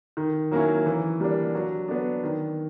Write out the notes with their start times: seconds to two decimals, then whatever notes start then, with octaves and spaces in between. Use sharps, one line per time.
0.17 D#3
0.51 F#3 A#3 C#4 E4
0.86 E3
1.20 G3 A#3 D4
1.55 F#3
1.88 B3 D4
2.24 D#3